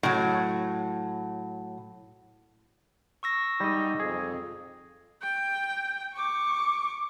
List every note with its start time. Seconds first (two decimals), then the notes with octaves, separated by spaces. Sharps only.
0.03 A2 F#3
3.23 C#6 E6 A#6
3.60 G3 G#3 B3 D#4 D#5
4.00 F2 G#4
5.22 G5
6.15 C#6 D6